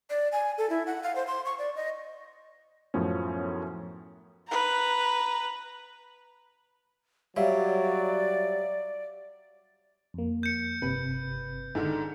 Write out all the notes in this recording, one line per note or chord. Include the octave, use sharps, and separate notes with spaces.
D5
G#5
A4
E4
F#5
F5
C5
C6
C#6
D5
D#5
F#2 A2 F3 B3 C#4
B4 A#5
F#3 G3 C#5 D5 E5 F5
F2 A#3
G6 C#7
G1 C3 B4
G#2 D3 D#3